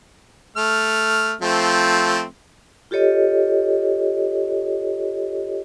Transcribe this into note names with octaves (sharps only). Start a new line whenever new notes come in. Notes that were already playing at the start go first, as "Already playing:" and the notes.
A3 F6
F3 A3 C4
F4 G4 A4 C#5 D#5